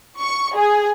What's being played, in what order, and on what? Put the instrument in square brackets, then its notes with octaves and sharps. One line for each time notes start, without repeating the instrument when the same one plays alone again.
[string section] C#6
G#4